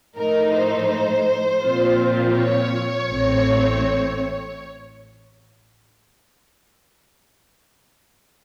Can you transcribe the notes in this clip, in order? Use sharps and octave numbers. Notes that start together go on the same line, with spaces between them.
A2 F3 A3 D#4 A#4
C5
A#2 F3 C4 F4
C#5
A1 A2 A3 C4